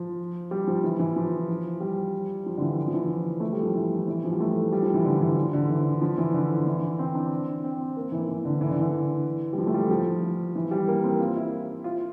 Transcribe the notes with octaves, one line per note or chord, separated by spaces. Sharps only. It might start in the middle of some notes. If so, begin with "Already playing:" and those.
Already playing: F3
G3
F3
E3
E3
F3
G3
F3
D3
E3
F3
E3
A3
G3
F3
E3
E3
F3
G3
A3
G3
F3
E3
D3
E3
F3
D3
E3
F3
E3
D3
E3
C4
D4
C4
A#3
E3
E3
D3
E3
D3
E3
G3
F3
A3
G3
F3
E3
G3
A#3
C4
F4
E4
F4